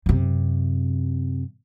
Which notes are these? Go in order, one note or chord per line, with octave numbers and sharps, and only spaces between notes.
F#2 C3